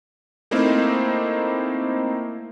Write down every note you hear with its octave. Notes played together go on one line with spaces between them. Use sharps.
A3 A#3 C4 D#4 E4 C5